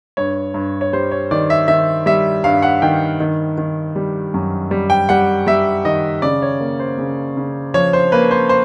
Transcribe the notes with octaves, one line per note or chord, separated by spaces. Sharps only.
G2 C#5
G2
C#5
G3 C5
C#5
D#3 D5
E5
D#3 E5
G3 E5
G2 F5
F#5
D#3 G5
D#3
D#3
G3
F#2
G3
G5
G3 F#5
G3 E5
D#3 D#5
C#3 D5
C#5
A#3
C5
C#3
C#3
F3 C#5
C5
A#3 B4
C5
C5